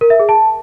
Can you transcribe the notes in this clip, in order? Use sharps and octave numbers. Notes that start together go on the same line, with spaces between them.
A#4
E5
G#4
A5